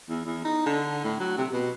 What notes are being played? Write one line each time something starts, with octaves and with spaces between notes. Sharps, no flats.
E2
E2
D#4
D3
A2
F#3
C3
B2